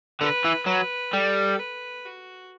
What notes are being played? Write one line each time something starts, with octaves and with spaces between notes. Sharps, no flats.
D3 B4
E3
F#3 B4
G3 A4
B4
F#4